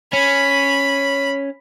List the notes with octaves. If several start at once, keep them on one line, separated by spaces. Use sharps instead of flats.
C#4 B5